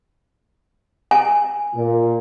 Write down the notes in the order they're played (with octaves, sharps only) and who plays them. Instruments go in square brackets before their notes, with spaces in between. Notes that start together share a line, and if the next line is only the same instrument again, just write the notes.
[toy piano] G#5
[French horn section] A#2